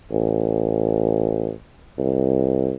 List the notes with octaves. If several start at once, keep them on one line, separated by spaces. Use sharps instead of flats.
A1
C2